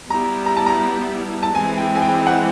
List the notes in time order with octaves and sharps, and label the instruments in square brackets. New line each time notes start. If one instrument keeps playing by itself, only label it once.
[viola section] G3 B3 E4 G4 [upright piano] A#5
[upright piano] A#5
A5
A#5
A5
[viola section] E3 G#3 C4 [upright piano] G#5
[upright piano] G5
G#5
G5
F#5